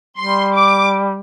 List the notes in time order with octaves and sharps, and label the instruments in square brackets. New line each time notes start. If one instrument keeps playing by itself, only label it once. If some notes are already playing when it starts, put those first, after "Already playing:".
[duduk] G3 [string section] C6
[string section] D6